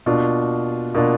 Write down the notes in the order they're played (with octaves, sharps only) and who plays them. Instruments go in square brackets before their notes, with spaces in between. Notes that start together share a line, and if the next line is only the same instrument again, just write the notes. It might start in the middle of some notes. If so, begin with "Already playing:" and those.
[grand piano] B2 A#3 D4 F4
B2 A#3 D4 F4